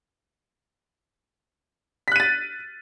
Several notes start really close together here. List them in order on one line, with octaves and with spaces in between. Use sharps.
B6 F#6 D#7 A6